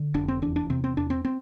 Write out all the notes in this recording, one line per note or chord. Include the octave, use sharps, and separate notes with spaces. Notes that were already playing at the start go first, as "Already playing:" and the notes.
Already playing: D3
F1 D4
C4
E2 D4
D4
C3 C4
C4
E2 D4
C4
C4